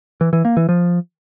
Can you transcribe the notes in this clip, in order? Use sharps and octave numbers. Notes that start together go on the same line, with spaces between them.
E3
E3
A#3
E3
F3